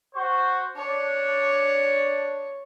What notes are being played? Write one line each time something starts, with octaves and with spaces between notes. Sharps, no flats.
F#4 C5 C#6
D4 C#5